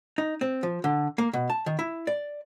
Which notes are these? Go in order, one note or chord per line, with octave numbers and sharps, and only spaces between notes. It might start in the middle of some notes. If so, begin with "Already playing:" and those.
D#4
C4
F3
D3
A#3
B2
A5
D#3
E4
D5